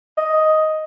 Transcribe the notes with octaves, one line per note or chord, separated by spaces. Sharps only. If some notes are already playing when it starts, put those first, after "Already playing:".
D#5